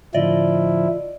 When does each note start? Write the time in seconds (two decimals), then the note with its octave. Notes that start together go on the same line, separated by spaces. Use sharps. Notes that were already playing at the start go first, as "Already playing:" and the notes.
0.14 A2 D3 F3 E4 D5 D#5